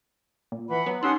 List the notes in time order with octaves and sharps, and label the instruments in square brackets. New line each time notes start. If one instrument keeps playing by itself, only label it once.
[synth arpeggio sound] A#2
[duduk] E3 [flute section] F#5 B5
[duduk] F#3 [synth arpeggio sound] B3
[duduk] C#4 [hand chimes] D#4 [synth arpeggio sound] G4 E6 F#6 [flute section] F#5 C6 D#6